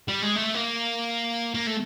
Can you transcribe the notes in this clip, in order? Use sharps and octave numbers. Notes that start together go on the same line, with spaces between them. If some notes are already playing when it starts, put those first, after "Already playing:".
G3
G#3
A3
A#3
A#3
A3